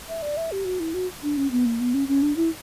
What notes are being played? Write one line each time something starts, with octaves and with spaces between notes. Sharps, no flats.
E5
D5
E5
G4
F#4
E4
F#4
D4
C#4
B3
A#3
B3
C#4
C#4
D4
E4